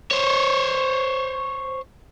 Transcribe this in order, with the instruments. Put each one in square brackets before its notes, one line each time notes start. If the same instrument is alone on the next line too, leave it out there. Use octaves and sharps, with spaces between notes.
[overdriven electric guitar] C5 C#5